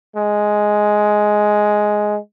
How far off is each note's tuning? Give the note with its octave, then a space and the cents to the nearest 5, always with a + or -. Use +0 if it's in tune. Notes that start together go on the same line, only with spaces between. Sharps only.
G#3 +5